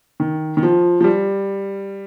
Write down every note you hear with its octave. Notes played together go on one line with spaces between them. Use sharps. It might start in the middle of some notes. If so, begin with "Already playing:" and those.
D#3
D#3
F3
F3
G3